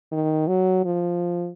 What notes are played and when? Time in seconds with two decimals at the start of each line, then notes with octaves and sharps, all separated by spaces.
0.12 D#3
0.48 F#3
0.85 F3